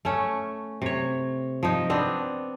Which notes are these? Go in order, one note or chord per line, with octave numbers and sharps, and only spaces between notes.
A3 C#4
C3 C#5
F3 D#4
B3 C4 D4